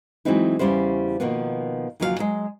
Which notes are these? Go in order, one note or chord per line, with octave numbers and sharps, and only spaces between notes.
E3 F#3 G#3 C4 D#4 E4
E2 C#3 G3 C#4 E4 C5
B2 D#3 F3 A#3 B3
D#2 C#3 F3 F#3 B4 F5
F#3 G#3